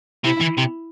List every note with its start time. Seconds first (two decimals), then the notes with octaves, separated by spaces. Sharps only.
0.24 C3 E4
0.41 E3
0.58 C3